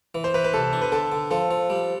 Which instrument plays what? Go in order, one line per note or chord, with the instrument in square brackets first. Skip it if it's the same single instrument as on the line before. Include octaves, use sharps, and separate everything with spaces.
[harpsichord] E3
[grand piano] C5
[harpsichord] E3 [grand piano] B4
[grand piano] B4
[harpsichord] C2 [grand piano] A4
[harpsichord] D4
[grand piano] B4
[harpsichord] D3 [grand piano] A4
[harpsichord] D3
[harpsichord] F3 [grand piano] A4
[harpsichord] F3
G3